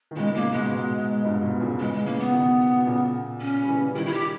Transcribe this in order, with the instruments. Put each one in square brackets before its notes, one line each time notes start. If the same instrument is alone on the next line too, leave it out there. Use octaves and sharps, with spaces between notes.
[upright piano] D#3
[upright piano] A#2 C#3 [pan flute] G#3
[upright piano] A#2 C#3 [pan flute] A#3
[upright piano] G#2 B2 [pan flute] G#3
[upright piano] G#2 B2
G2 A#2
G#2 B2
A#2 C#3
[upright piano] C#3 E3 [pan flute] G#3
[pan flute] G#3
[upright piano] C#3 E3 [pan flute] A#3
[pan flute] B3
[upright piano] B2 D#3
B2
A#2 C#3
[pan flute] C#4
[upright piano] G3
C#3 E3
[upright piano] D#3 G3 [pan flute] E4
[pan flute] E4
G4